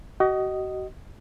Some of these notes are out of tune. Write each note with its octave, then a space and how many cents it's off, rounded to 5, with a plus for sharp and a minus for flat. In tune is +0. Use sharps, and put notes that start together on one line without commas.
F#4 +40 D#5 +0